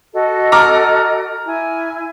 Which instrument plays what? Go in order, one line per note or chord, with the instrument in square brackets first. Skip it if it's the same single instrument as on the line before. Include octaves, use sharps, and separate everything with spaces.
[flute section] F#4 A4 D#5
[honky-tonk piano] A#5 D6 F6
[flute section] E4 G#5